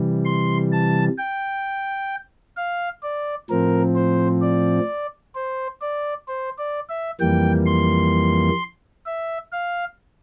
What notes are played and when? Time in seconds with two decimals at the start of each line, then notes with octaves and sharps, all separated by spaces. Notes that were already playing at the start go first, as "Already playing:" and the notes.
Already playing: C3 E3 G3
0.25 C6
0.72 A5
1.18 G5
2.57 F5
3.03 D5
3.50 A2 F3 C4 A#4
3.96 C5
4.42 D5
5.35 C5
5.82 D5
6.28 C5
6.58 D5
6.89 E5
7.20 F2 E3 G3 A#3 G5
7.66 C6
9.06 E5
9.52 F5